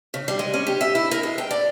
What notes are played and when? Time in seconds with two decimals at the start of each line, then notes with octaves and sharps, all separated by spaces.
0.14 C#3
0.28 G3
0.39 G#3
0.54 C#4
0.67 G4
0.81 E5
0.95 E4
1.11 A#4
1.23 G#3
1.38 G5
1.51 D5